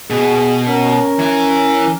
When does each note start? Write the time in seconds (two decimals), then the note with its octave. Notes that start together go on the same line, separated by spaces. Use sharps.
0.10 B2 B3 G#4
0.68 C#4 A#4
1.19 E3 G#5